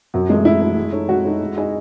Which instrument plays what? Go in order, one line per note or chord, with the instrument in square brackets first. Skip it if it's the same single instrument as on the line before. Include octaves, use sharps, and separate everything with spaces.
[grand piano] F#2 [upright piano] F#3
[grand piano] E3 A3 [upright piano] G#3
[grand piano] F#2 [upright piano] E4
[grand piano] E3 A3
G#3
D#4 A4 C#5
[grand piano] G#3 [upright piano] F#4
[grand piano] D#4 A4 C#5
G#3
D#4 G#4 D#5